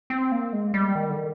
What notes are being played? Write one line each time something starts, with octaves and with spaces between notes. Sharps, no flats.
C4
A#3
G#3
G3
D#3
D3
D#3